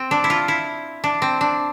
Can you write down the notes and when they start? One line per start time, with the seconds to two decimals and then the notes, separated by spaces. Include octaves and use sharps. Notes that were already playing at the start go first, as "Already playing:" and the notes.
Already playing: C4
0.11 D4
0.24 E4
0.30 F4
0.48 E4
1.04 D4
1.22 C4
1.41 D4